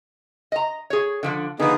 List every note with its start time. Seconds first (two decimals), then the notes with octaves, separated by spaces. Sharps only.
0.52 D#5 A#5
0.90 G#4 C#5
1.23 D3 F3 D4
1.60 D3 F3 B3 D#4 G#4